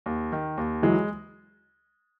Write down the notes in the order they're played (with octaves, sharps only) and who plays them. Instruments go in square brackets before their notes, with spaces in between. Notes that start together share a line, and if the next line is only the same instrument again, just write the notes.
[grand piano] D#2
D#3
D#2
[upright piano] E3 F#3 [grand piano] G#3